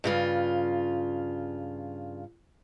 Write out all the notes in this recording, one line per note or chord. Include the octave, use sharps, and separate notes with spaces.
G2 C#3 F4